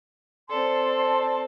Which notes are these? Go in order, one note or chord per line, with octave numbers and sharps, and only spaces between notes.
C4 A4 D5 A5 C6